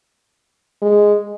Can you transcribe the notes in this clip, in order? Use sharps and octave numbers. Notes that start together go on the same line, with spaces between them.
G#3